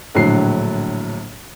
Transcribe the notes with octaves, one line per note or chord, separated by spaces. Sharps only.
A#1 A2 D3 F#3 C7